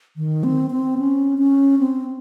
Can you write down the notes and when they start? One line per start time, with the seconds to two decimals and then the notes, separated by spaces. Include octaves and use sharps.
0.17 D#3
0.44 C4
0.71 C4
0.98 C#4
1.38 C#4
1.79 C4